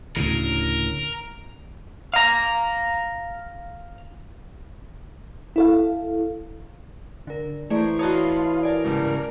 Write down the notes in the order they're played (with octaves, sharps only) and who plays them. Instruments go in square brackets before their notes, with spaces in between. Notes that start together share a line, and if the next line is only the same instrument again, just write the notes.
[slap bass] D2 A2 C#3 [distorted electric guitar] A#4
[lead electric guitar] F5 A#5
[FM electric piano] E4 A4 F5
[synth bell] D3 A#4
[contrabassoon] E3 [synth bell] A3 G#4 D5 [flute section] C5 A#5 C#6
[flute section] F4 F5 B5 [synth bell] F#4 A5 D#6 [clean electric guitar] C#5 D#5
[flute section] A#4 [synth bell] D5 G#5 A5
[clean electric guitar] G#2 C#3 G3